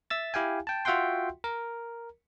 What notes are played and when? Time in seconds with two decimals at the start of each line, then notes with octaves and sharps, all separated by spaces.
0.10 E5 E6 A6
0.34 E4 G4 F5 G5 G#5
0.67 G5 A5
0.85 F4 F#4 E5 F#5 G5 C6
1.44 A#4